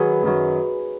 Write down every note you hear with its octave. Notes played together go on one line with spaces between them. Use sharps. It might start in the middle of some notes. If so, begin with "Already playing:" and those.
Already playing: D#3 F#3 G#4 B4
F#2 D#3 F#3